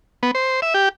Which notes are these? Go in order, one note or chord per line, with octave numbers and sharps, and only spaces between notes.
B3
C5
E5
G4